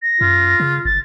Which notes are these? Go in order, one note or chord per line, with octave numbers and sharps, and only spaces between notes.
A#6
F#2 F4
C#3
G1 A6